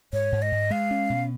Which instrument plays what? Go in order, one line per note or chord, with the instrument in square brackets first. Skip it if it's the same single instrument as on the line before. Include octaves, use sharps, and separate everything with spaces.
[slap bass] G#2 [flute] C#5
[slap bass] G#2
[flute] D#5
[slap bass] G#2
[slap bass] G#3 [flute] F5
[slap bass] C#4
B2